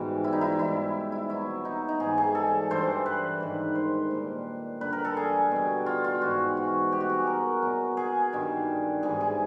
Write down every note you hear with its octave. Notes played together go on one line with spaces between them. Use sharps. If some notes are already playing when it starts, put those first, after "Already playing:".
Already playing: G#2 B2 E3 G3
E4
D#4
E4
G#2 E3 G3 E4
E4
B2 F#3 E4
D#4
D#4
G#2 E3 G3 G#4
G#4
A4
G2 E3 G3 C5
B4
G#2 D#3 G3
C5
A#2 G3
G2 D3 G3 B4
A#4
A4
G#4
B2 G3
F4
F4
G#2 E3 G3 F#4
F#4
B2 G3 G4
F#4
G#4
A#4
B2 F#3
G#4
G2 D#3 G3
G#2 E3 G3 G#4
G#4